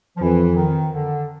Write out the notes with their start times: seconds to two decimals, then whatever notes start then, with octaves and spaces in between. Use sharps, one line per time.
0.17 F3
0.21 F2 E3
0.56 D#3
0.92 D3